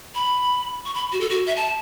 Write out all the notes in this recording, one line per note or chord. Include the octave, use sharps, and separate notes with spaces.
B5
C#6
B5
F#4
A4
F#4
E5
A5